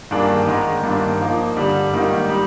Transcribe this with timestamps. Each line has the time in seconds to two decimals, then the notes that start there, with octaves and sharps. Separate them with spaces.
0.11 G2 D#3 A#3 D4 G#4
0.47 G#2 D#3 G#3
0.83 G2 D#3 A#3 D4
1.20 F3 A#3 D#4
1.57 G2 D3 G3
1.93 G#2 D#3 G3 A#3 D#4
2.30 G3